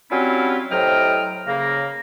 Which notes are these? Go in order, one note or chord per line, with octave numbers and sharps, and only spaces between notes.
F#3 G3 C4 C#4 E4 F4
A2 C3 F#3 D#5 G5 F6
C#3 A#3